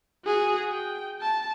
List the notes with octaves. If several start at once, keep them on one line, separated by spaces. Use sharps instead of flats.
F#4 G#4
G5
A5